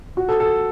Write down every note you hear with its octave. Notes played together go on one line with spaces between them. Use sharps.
F#4
A4
A4